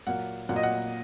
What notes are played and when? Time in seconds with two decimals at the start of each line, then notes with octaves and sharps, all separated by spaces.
0.07 A#2 F#3 A#3 F#5
0.49 A#2 F#3 A#3 F#5
0.56 D#5
0.63 F#5